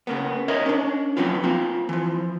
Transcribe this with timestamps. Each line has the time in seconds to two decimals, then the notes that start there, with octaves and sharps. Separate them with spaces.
0.07 C#3 A#3 B3
0.48 A#4 C#5 D#5 E5
0.66 C#4 D4
1.17 F3 F#3 B3 C4 D4 F4
1.44 A#3 C4 F4
1.89 E3 F3